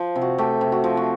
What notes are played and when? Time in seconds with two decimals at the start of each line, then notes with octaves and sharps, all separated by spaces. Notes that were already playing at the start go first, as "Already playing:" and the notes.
Already playing: F3
0.16 C3
0.21 F#4
0.38 A3 G4
0.61 C3
0.72 F#4
0.84 F3
0.97 F#4